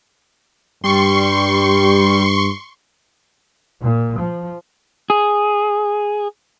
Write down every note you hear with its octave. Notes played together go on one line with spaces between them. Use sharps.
G2 G3 C6 C#6
A#2
F3
G#4